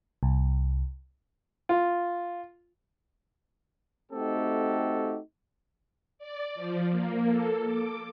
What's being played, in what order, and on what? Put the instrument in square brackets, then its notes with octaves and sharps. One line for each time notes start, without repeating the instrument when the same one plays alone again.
[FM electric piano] C2
[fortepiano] F4
[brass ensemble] A3 C4 D#4 F#4 G4 A4
[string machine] D5
F3
A#3
A4
D6